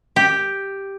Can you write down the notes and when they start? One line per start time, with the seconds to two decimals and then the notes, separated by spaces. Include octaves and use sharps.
0.16 G4